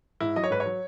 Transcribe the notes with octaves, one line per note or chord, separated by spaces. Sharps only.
G#2 E4
F#3 D#5
C#5
G#2 B4
C#5
F#3